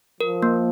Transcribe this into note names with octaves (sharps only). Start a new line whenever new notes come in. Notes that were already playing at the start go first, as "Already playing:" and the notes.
F3 A#4
A#3